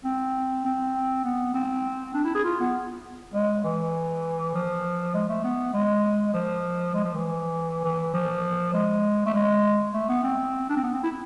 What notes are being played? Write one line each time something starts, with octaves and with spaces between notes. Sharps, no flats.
C4
C4
B3
C4
D4
E4
G#4
F4
B3
G#3
E3
F3
G#3
A3
B3
G#3
F3
G#3
F3
E3
E3
F3
G#3
A3
G#3
A3
B3
C4
D4
C4
B3
C4
E4